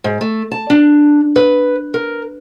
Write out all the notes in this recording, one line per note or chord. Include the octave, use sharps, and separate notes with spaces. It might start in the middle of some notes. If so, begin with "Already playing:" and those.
G#2
A3
A5
D4
B4
A#4